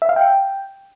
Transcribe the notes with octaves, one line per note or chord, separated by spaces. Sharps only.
E5
F5
G5